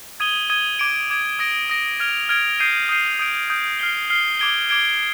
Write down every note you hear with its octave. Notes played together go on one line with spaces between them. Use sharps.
D#6 G#6 D#7 G7
D#6 G#6 D#7 G7
D6 G#6 D7
D6 G#6 D7
D#6 A#6 D7
D#6 A#6 D7
F6 G#6 D7 F7
F6 G#6 D7 F7
D#6 G6 C7 D#7
D#6 G6 C7 D#7
D#6 G6 D7
D#6 G6 D7
F6 C7 G7
F6 C7 G7
D6 G#6 D7 G7
D6 G#6 D7 G7